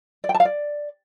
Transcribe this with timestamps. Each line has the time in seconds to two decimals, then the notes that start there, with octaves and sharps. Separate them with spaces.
0.24 D5
0.29 G5
0.34 A5
0.40 F5
0.45 D5